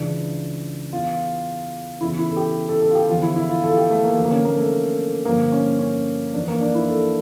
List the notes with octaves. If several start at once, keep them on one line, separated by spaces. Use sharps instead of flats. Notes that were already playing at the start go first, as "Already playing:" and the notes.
Already playing: C#2 C#3 E3 D4
E2 E3 F4
E2 C#3 E3 E4
E4
A4
G4
A4
A4
F4
G4
E2 D3 F3 F4
E4
E4
F4
A4
F4
G4
A3
A#3
E2 D3 F3
A#3
C#4
A#3
A3
G2 D3 F3 A#3
C#4
C#4
F2 E3 D4
A#3
D4
E4
A4